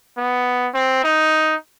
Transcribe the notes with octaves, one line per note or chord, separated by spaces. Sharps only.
B3
C4
D#4